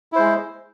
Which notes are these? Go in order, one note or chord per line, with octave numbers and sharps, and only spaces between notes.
G#3 E4 C5